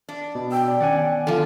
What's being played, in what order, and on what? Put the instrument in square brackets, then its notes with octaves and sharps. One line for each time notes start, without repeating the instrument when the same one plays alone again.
[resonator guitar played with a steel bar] D4
[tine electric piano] B2
[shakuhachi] G5 [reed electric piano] E6
[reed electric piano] D5
[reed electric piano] D#3 B3 C#4 [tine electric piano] D5 F#5 G#5
[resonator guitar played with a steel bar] D3 F3 [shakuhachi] A4